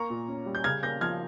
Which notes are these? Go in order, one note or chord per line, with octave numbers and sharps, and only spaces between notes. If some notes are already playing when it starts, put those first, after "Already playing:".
Already playing: A#3 A#5 C#6
A#2
C#4
G3
G6
C#3 F6 G#6
A#3 G6 A#6
F3 F6 G#6